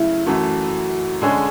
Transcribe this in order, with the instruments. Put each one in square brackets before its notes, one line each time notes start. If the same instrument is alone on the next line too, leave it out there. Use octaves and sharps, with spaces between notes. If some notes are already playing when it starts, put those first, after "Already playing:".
Already playing: [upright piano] C#3 F#3 A3 [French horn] E4
[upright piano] F#2 E3 A3 [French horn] F#4
[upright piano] D3 G#3 C#4 G#4